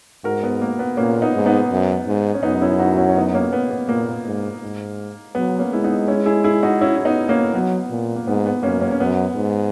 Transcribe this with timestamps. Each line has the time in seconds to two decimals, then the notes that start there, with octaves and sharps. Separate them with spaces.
0.24 G#2 F#4 A#4
0.43 B3
0.61 A#3
0.79 B3
0.97 A#2 A#3 C#4
1.22 B3 D#4
1.35 G#2
1.46 B3 D#4
1.71 F#2
2.07 G#2
2.34 C#4
2.43 F#2 B3 D#4
2.62 C#4 E4
2.79 D#4 F#4
2.93 F#4
2.98 C#4 E4
3.09 C#4
3.16 B3 D#4
3.34 A#3 C#4
3.53 B3
3.70 B3
3.89 A#2 A#3
4.25 G#2
4.62 G#2
5.35 F#3 B3
5.59 A#3 C#4
5.72 G#3 E4
5.84 B3 D#4
6.08 C#4 E4
6.26 E4 G#4
6.44 E4 G#4
6.63 D#4 F#4
6.81 C#4 E4
6.96 E4
7.05 B3 D#4
7.29 A#3 C#4
7.54 F#3 B3
7.90 A#2
8.16 A#3
8.27 G#2 B3
8.46 B3
8.63 F#2 A#3 C#4
8.81 A#3 C#4
8.91 C#4
9.00 F#2 B3
9.36 G#2